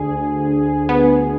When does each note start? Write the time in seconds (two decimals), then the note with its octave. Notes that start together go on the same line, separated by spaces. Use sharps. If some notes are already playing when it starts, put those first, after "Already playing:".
Already playing: D2 D3 G#4
0.89 B3